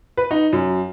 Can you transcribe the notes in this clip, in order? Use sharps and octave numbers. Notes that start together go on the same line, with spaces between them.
B4
D#4
F#2